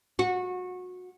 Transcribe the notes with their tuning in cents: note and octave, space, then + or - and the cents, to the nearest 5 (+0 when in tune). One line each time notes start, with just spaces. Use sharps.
F#4 -25